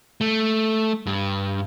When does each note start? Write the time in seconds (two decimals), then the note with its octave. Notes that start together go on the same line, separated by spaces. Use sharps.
0.21 A3
1.07 G2